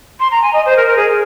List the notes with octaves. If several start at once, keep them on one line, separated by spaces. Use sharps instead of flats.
C6
A#5
G#5
D#5
C5
A#4
A#4
G#4